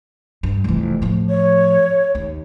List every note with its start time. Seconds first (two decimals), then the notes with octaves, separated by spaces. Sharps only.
0.43 G2
0.64 F1 E3
1.02 A2 F3
1.29 C#5
2.15 D#2